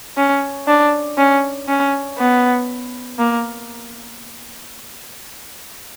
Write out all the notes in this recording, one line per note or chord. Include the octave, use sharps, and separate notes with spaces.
C#4
D4
C#4
C#4
B3
A#3